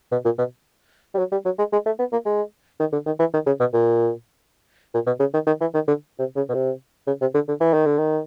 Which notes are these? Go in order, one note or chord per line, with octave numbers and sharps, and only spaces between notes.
B2
A#2
B2
G3
F#3
G3
F#3
G#3
G#3
A3
B3
A#3
G#3
D#3
D3
D#3
E3
D#3
C#3
B2
A#2
A#2
B2
C#3
D#3
D#3
E3
D#3
D3
C3
C#3
B2
C3
C#3
C3
D3
D3
E3
D#3
D3
D#3